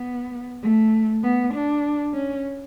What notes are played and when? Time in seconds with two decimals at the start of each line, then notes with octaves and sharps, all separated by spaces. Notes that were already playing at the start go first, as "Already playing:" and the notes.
Already playing: B3
0.62 A3
1.23 B3
1.54 D4
2.13 C#4